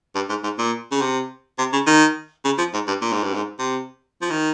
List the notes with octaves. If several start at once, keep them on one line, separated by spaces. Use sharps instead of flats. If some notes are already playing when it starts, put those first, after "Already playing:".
G2
G#2
G#2
A#2
C#3
C3
C3
C#3
D#3
C#3
F3
G#2
G2
A#2
G#2
G2
G#2
C3
F3
D#3